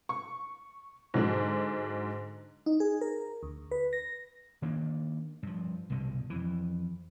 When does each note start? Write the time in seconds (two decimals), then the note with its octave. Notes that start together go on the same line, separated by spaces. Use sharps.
0.09 C#6
1.14 G#2 D3 F#3 D4
2.66 D#4
2.80 G#4
3.01 A#4
3.43 D2
3.71 B4
3.93 A#6
4.62 D#3 A#3 B3 D4
5.43 G2 F3
5.90 C2 G2 B2 D3
6.30 F2 E3